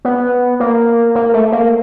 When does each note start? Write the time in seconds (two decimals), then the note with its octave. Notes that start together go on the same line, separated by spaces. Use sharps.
0.05 B3
0.60 A#3
1.15 A#3
1.34 A3
1.52 A#3